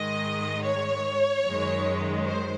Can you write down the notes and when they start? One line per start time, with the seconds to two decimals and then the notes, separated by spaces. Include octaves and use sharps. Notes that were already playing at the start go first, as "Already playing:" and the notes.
Already playing: G#2 D#3 G#3 D#5
0.64 C#5
1.44 F#2 D#3 G#3
2.26 C5